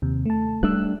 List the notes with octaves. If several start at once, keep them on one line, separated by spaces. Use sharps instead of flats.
D#2 C3
A3 A5
G3 A3 D4 E6 F#6